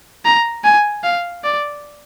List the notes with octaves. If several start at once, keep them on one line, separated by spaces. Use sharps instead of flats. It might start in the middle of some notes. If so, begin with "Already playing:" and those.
A#5
G#5
F5
D5